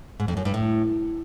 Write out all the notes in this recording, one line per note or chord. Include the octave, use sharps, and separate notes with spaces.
G#2
F2
F#2
G2
A2